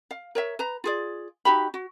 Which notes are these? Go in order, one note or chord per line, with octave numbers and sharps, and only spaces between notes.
F5
A#4 C#5 E5
B4 A#5
F4 G#4 D5
D#4 F#4 G4 B5
F#4